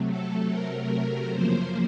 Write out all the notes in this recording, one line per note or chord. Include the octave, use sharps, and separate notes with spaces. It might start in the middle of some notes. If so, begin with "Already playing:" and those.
Already playing: C3 F#3 A3
A4
A#4
A#4
F#2 C#3 F3 A#3 C5